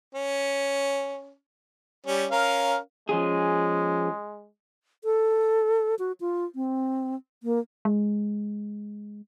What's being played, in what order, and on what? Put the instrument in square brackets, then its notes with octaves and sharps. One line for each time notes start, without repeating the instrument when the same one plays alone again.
[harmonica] C#4
G3 C#4
C#4 A#4 F5
[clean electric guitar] F3 C#4 G#4 [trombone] G#3
[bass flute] A4
F#4
F4
C4
A#3
[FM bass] G#3